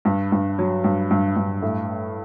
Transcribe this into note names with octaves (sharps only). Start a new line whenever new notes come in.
G2
G2
F#3
G2
G2
G2
A2